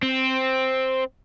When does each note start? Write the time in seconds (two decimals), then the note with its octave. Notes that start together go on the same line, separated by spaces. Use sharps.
0.02 C4